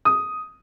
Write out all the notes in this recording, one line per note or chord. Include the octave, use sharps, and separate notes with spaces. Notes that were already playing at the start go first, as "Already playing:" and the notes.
D#6